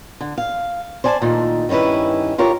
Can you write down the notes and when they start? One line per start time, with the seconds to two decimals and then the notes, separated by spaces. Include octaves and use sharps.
0.21 D3
0.38 F5
1.04 C5 D5 G#5 A5
1.22 A#2 D#3 A3
1.69 G2 D#3 C#4 E4 B4
2.38 F4 G4 A#4 C#5